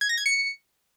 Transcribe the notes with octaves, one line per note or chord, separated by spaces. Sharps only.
G#6
A#6
G#6
C#7